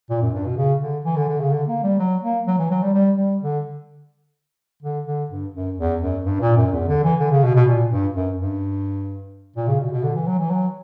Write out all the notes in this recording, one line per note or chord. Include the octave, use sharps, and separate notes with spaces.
A#2
F#2
G2
B2
C#3
D3
E3
D3
D3
C#3
D3
A#3
G3
F#3
A#3
F#3
E3
F#3
G3
G3
G3
D3
D3
D3
G2
F#2
E2
F#2
G2
A#2
F#2
E2
D3
E3
D3
C#3
B2
B2
A#2
G2
F#2
G2
A#2
C#3
B2
B2
D3
E3
F#3
E3
F#3